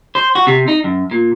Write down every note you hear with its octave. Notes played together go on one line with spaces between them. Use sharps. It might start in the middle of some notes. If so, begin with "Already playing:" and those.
C5
F#4
C3
D#4
F#2
A#2